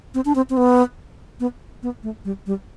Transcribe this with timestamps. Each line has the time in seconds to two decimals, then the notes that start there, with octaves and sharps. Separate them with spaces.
0.14 C4
0.25 D4
0.35 C4
0.50 C4
0.57 B3
1.40 B3
1.83 B3
2.03 A3
2.25 G3
2.46 G3